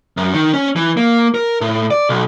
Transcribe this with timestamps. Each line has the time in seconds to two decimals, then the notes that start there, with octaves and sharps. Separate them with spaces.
0.17 F#2
0.34 D#3
0.54 C#4
0.76 E3
0.97 A#3
1.34 A#4
1.61 A2
1.91 D5
2.09 B1